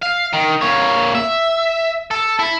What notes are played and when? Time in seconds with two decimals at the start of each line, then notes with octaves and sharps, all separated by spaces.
0.03 F5
0.34 D#3
0.62 A#2 C#5
1.15 E5
2.11 A4
2.39 E4